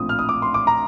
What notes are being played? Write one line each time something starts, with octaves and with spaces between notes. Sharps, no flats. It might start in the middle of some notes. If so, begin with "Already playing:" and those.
Already playing: A#1 A2 F3 C4 D#6
F6
D#6
D6
C6
D6
A#5